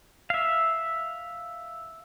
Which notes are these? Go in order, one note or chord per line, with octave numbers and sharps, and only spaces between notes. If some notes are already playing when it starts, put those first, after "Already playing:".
E5 F5